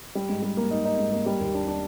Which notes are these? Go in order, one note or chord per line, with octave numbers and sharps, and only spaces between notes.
G3
G#2
G3
A#3
D#4
D#4
G#2
A#3
G3
D#2
D4
D4